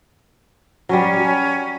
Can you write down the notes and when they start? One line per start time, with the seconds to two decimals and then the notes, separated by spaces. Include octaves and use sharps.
0.89 F#3 G3 C#4